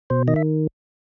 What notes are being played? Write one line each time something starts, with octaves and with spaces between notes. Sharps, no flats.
B2 C5
D#3 D#5
E5